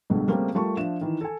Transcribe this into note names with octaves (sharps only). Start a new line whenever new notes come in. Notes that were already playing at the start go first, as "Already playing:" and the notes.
C#2 G2 B2 D3
C#3 G3 A3 A#3 C4
G3 A3 F4 A#4 A5 C#6
F3 D4 E5 E7
D#3 E3
A4 G#5